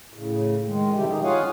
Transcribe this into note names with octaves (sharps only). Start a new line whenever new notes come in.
A2 C#3
D#3 G#3
B2 D3 F3 G3 E4 G4
D#3 D#4 G#4
F4 G#4 C#5 F5 F#5 G#5